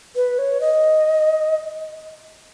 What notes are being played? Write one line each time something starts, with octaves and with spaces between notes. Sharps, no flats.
B4
C#5
D#5